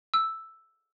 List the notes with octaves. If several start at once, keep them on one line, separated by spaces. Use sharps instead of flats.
E6